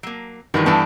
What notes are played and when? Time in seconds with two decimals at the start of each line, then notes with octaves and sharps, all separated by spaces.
0.03 F#3 A#3
0.54 G2 D#3 E3 G#3 F4 F#4
0.66 G2 E3 B3 A4 G5 A5